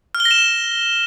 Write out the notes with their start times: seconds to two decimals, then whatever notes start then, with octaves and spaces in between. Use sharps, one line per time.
0.15 F6
0.20 G7
0.25 A#6
0.31 E7